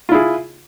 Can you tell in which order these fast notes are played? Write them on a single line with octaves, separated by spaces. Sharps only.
F4 E4 G#4